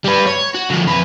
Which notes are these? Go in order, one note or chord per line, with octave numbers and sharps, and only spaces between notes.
G3 B4
C#5
F#4
D3 F3
F2 B4